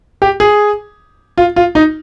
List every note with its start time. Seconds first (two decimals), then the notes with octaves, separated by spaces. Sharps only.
0.22 G4
0.40 G#4
1.38 F4
1.56 F4
1.75 D#4